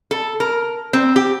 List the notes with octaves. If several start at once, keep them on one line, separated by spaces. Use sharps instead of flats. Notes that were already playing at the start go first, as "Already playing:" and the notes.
A4
A#4
C4
G4